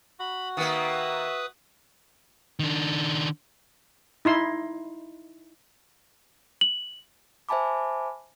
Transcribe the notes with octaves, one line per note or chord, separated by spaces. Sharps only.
F#4 B5
D#3 A#3 B4 E5 D#6
D#3 D4
D#4 E4 C6
F#7
C5 E5 G#5 A5 B5 D6